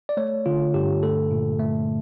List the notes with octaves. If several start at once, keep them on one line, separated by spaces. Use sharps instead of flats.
D5
A3 C#5
D3 F4
G2 G4
A3 A4
A#2
A3